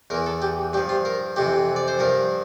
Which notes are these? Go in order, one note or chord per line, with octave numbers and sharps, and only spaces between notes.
E2 E3 A#4
A4
G4
G2 F3 G4
F4
A#4
F2 C3 E3 G4
D5
C5
G2 F3 A#4